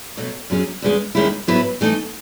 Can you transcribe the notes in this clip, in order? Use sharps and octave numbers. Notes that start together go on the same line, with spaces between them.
B2 F#3 A3
F#2 C#3 F#3 C#4 G#4
E2 C#3 G#3
D#2 D#3 G#3 C#4 E4
G#2 F#3 B3 E4 B4
E3 A3 D#4